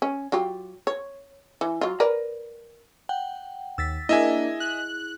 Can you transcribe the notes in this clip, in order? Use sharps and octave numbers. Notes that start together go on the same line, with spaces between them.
C#4
F#3 F4 G4
C#5
E3
F#3 F4
A#4 B4 D5
F#5 G5
D#2 E6 A6 B6
A#3 D4 E4 G#4 D#5 E5 G#5
F#6